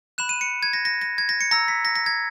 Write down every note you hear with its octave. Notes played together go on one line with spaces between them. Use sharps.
B5 F#6 E7
D#7
C#7
G#6
A#6
A#6
A#6
G#6
A#6
C#7
A#5 E6 A#6
B6
A#6
A#6
G#6